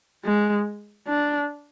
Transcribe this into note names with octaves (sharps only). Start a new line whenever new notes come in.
G#3
D4